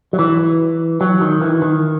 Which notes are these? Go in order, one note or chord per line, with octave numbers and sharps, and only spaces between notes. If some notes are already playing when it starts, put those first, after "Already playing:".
F#3
E3
F#3
D#3
E3
D#3